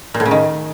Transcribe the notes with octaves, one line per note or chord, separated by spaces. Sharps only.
A#2
A2
C#3
D#3